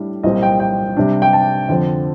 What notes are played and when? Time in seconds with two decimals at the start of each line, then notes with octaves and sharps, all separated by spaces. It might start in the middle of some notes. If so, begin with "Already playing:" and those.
Already playing: A2 G3 D4
0.23 C2 A#2 G3 C4 D#5
0.43 G5
0.60 G5
0.97 C3 G3 D4
1.22 G5
1.33 A5
1.69 F2 D3 F3 C4